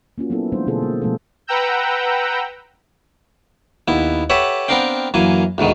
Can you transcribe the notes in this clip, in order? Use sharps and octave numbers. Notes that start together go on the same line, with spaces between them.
A#3 C#4 F4 F#4
F#3 A#3 B3 D#4 E4 A4
E3 G3 A3 D4 D#4 C5
B2 D3 F4 G#4 A4 C5
A#3
B2 F3 G3 A3 C#4 A4
B4 F#5 G5 A#5 E6 G6
D#2 B3 E4
G4 A4 B4 C#5 E5 F#5
B3 C4 D4 A#4 F5 G5
F#2 E3 A#3 G#5
D2 G#2 B2 D#3